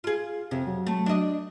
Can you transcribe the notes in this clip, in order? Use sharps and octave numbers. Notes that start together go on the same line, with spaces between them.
F4 G#4
F2 C3
F#3
A3
D4 D#5